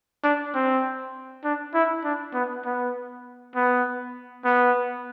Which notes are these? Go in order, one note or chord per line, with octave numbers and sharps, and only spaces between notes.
D4
C4
D4
E4
D4
B3
B3
B3
B3